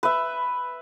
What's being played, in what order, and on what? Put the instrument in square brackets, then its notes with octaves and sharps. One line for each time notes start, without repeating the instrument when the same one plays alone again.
[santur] B4 E5